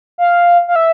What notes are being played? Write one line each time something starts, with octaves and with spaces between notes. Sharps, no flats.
F5
F5
E5